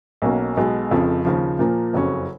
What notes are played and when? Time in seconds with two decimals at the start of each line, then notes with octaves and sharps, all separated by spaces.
0.22 B1 B2 A#3 C#4 F#4
0.57 B1 B2 G#3
0.91 F1 F2 C#3 F3
1.25 D#2 C#3 F3
1.59 A#2 F3 A#3
1.93 F#1 F2 C#3 F#3 C#4